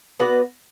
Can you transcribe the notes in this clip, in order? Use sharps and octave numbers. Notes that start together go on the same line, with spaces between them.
B3 F#4 B4 D5